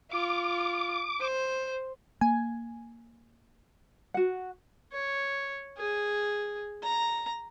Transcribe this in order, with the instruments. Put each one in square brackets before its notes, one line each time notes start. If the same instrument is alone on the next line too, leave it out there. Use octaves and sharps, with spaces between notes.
[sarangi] F4 [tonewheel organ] D6
[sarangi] C5
[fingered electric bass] A#3 [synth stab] G#5
[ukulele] F#4 F#5
[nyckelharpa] C#5
G#4
A#5